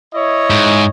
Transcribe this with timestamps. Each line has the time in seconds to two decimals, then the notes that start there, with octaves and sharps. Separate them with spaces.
0.14 E4 C#5 D#5
0.50 G#2